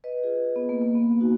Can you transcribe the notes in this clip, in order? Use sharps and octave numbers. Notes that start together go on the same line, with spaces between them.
B4 D#5
F4 G#4
B3
A#3
A#3
B3
D#4 F#4